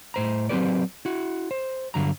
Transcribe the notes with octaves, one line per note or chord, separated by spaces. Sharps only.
A2 C5 A#5
F#3 C4 C#4 G4 B4 D5
E4 F#4
C5
G2 D3 F#3 A#5